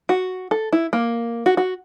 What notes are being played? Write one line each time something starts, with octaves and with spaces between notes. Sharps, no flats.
F#4
A4
E4
A#3
F#4
F#4